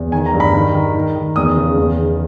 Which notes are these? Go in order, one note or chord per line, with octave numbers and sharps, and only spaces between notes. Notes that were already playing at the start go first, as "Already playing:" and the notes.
Already playing: E2
D#3 G#5
A#5
G2
B5
D#3
D#3
D#3
D#3
E2 D#6
C#3
E2
D#3